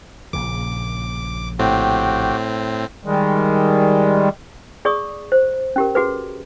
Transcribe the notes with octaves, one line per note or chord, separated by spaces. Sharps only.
A#1 A#2 C#3 D6
A2 C4 F#4 G4 G5
D#3 G3 G#3
G#4 D5 C#6 D#6
C5
C#4 G4 A#4
F#4 G#4 B4